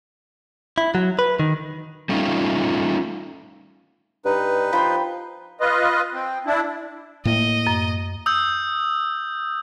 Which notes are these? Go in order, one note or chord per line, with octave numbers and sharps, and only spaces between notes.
E4
F#3
B4
D#3
G3 A3 C#4 D#4 F4
G2 D#4 B4
F3 C5 G5 B5
F4 B4 D#5
C4
D4 E4
A2 A#3 D#5
F#2
D#6 E6 G6